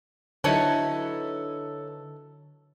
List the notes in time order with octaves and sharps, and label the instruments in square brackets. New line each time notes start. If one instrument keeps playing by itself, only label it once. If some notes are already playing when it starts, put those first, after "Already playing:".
[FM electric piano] D3 [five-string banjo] F#3 D#4 E4 [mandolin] A4 B4 C#5